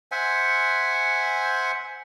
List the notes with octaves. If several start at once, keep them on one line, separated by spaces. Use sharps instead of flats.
C5 E5 F#5 G#5